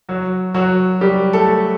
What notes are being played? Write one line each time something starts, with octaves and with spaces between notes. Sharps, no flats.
F#3 F#4
F#3 F#4
G3 G4
A3 A4